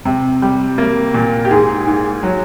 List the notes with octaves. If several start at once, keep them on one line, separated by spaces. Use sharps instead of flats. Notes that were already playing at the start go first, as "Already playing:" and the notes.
C3
G3
A#3
A#2
G4
G#2 G#4
G#2
F#3